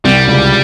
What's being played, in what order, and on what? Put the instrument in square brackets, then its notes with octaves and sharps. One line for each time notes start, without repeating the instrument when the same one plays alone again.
[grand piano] C2 C3 [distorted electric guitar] G3
[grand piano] C#2 C#3